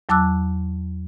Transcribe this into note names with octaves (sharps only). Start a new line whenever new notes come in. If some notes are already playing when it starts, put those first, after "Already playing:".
E2 F#3 A5 D6 E6 F#6